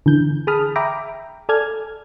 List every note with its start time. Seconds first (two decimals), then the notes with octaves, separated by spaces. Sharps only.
0.06 D3 E3 G6
0.47 G#4 A5 B5 D#6 F6
0.76 E5 G5 A#5 B5 D6
1.49 A4 D5 G#5 F6 G#6